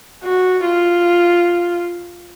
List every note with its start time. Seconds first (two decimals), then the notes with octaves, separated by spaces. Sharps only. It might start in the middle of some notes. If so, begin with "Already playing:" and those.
0.24 F#4
0.65 F4